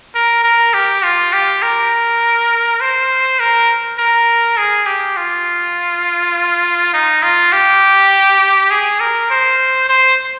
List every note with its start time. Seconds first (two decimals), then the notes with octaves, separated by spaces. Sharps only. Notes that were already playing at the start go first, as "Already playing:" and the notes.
0.15 A#4
0.44 A#4
0.74 G4
1.03 F4
1.33 G4
1.62 A#4
2.81 C5
3.40 A#4
3.99 A#4
4.57 G#4
4.87 G4
5.17 F4
6.94 D#4
7.23 F4
7.53 G4
8.71 G#4
9.00 A#4
9.30 C5
9.89 C5